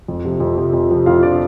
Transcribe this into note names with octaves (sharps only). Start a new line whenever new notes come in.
F2
C3 F3
F2
C3 F3
F2
C3 F3
F2 F4 F5
C3 F3 D4 D5